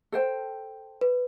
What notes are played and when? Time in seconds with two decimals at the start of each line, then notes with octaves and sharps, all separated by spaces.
0.12 A4 C5 G5
1.01 B4